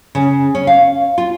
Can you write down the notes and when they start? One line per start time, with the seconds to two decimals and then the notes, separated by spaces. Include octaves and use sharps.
0.15 C#3
0.55 C#4
0.67 F5
1.18 F4